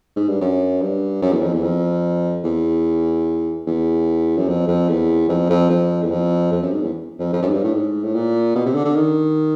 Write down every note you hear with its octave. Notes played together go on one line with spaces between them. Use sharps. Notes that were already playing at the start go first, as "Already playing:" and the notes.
G#2
G2
F#2
G2
F#2
E2
F2
E2
F2
E2
E2
F#2
F2
F2
E2
F2
F2
F2
E2
F2
F2
F#2
G#2
E2
F2
F2
F#2
G#2
G2
A2
G#2
A2
A#2
B2
C3
D3
D3
D#3